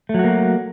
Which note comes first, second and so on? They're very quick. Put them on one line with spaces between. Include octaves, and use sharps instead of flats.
A3 F#3 F#4 A#3